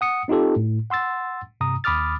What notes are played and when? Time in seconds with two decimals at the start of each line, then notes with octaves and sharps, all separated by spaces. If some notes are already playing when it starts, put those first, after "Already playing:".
0.01 F#5 D#6 C#7
0.28 C4 D#4 F4 G4 A4
0.56 A2
0.90 F#5 C6 E6 A6
1.61 G2 C3 A#5 D#6
1.84 D#2 B5 D6 D#6 F6 A6